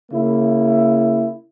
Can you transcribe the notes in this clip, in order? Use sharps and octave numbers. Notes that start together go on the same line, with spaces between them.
C#3 A#3 E4